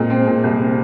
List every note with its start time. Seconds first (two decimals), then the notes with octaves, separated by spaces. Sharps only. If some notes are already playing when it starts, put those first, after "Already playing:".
Already playing: A#2 G#3 C4
0.10 C4
0.27 A#2
0.44 C2
0.60 C4